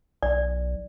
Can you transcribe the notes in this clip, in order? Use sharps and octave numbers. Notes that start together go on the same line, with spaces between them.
B1 D5